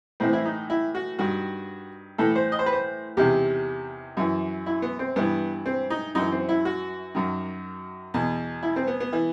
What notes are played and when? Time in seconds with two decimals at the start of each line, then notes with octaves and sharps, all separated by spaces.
0.20 A2 E3 C4
0.33 E4
0.45 D#4
0.70 E4
0.95 F#4
1.19 G2 D#3 F#4
2.18 A2 E3 A4
2.36 C5
2.52 D#5
2.59 C5
2.66 B4
2.73 C5
3.17 E2 C3 D#3 G4
4.17 F#2 E3
4.66 E4
4.82 B3
4.99 C4
5.16 G2 E3 B3
5.66 C4
5.90 D#4
6.15 F#2 E3 D#4
6.32 C4
6.49 E4
6.65 F#4
7.15 F#2 D#3
8.14 E2 B2
8.63 E4
8.76 C4
8.87 B3
9.00 B3
9.13 E3